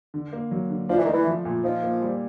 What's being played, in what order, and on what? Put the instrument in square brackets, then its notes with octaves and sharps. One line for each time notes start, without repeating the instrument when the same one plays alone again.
[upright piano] D3
A#3
F#3
D3
[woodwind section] F3 [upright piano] D4
[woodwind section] E3
[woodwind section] D#3 [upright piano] A3
[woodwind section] E3
[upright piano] F3
A#2
[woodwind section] F3 [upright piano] D#4
[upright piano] A#3
G3